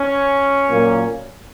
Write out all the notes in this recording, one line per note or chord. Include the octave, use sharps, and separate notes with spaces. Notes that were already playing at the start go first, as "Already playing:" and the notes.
Already playing: C#4
A#2 F#3 A#3